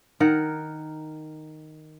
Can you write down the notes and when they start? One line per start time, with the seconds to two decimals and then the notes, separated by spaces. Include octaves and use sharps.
0.20 D#3 A#4 F#5